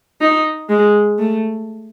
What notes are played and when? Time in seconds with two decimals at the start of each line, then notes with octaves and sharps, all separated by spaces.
0.21 D#4
0.69 G#3
1.19 A3